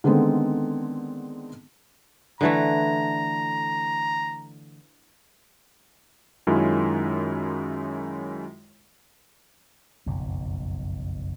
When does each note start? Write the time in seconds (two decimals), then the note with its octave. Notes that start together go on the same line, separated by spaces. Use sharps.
0.04 D3 D#3 G#3 A3 B3 C4
2.41 D3 E3 A3 A#5
6.47 F#2 D#3 G#3 C#4 E4 F4
10.06 F#1 B1 F2